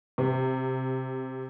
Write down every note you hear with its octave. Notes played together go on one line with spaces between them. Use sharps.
C3